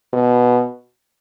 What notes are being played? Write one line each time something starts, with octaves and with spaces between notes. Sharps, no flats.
B2